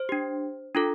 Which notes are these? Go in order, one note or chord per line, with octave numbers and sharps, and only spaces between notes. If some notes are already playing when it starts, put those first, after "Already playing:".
Already playing: C5
D4 G4
D4 F4 A4